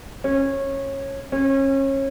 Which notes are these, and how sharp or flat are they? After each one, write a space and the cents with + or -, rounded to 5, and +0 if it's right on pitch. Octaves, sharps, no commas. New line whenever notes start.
C#4 -20
C#4 -30